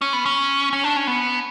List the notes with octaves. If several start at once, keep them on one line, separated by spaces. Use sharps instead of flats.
C#4
B3
C#4
C#4
D4
C#4
B3